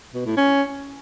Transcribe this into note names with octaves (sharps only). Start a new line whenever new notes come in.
B2
A2
C#4